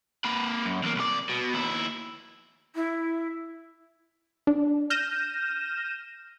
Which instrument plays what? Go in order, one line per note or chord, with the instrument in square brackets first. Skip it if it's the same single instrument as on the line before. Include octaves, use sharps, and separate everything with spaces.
[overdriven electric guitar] A#3 B4
F#2
E2 A#3
C2 D5
B2
D#2 E4
[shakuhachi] E4
[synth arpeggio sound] D4
F6 G6 A#6 D#7 E7